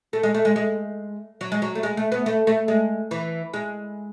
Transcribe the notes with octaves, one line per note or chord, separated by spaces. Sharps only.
A3
G#3
A3
G#3
G#3
F#3
G#3
F#3
A3
G#3
A3
B3
A3
A3
G#3
E3
G#3